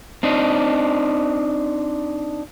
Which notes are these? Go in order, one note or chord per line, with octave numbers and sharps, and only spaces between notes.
C4 D4 D#4